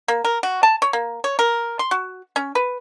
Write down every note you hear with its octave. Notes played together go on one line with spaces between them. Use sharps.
A#3
A#4
F#4
A5
C#5
A#3
C#5
A#4
C6
F#4
C#4
B4